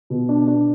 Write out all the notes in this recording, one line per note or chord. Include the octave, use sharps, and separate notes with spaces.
B2
D4
D4